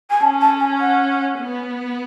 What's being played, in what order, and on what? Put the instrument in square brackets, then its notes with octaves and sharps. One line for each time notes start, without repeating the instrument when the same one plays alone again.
[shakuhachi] G#5
[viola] C#4 [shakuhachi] A5
[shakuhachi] A5
G#5
F#5
[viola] B3